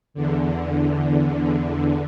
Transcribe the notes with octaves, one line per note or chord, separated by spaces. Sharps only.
E2 D3